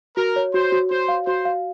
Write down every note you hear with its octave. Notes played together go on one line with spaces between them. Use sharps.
F#4 A#4
C#5
F#4 C5
F#4
F#4 C5
F5
F#4 C5
F5